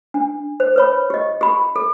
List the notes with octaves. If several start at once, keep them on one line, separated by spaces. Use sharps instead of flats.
D4
C5
B4 C#5 B5
G4 D#5
G4 B5
A4